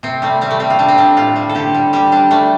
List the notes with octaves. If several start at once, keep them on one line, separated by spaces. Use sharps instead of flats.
C3 C4
G3 A3
G3 C4
A3
G3 C4
F4
G3 D4
C4
G3 D4
A2 F4
G3
A4
D3 G4
G3
G3 G4
G3 D4
G3 A3